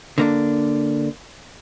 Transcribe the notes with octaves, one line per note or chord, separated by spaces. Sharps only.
D3 A#3 D4